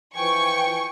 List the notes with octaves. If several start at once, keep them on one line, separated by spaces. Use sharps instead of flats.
E3 F3 G5 G#5 C#6